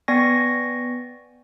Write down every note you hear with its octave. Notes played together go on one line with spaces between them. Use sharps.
B3 D5 G5 G#5 C#6 A#6